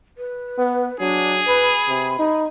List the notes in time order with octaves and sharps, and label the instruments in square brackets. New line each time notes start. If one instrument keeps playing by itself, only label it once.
[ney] B4
[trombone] B3
[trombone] F#3 [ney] D4 [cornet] G#4
[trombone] B4 [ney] B5
[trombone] C3
D#4